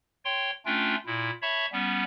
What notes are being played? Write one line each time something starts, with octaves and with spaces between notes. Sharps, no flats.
C#5 G5 C6
A3 C#4 D4 F4 G5
A#2 E4
C#5 E5 A5 B5 C#6
G3 B3 C#4